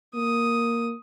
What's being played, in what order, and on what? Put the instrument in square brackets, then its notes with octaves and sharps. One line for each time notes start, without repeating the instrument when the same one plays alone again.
[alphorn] A#3 [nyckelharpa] D#6